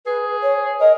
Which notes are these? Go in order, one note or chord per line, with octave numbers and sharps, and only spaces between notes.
G#4 B4
C#5
A#4 D#5